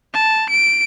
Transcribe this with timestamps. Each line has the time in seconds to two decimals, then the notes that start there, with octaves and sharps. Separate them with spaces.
0.14 A5
0.50 D7